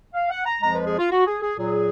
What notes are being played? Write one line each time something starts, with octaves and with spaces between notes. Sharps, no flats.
F5
F#5
A#5
F2 F3 G#3 A#5
B4
G#4
F4
F#4
G#4
G#4
A#2 F#3 G#4